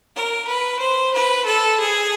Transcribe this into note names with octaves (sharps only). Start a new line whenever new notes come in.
A#4
B4
C5
B4
A4
G#4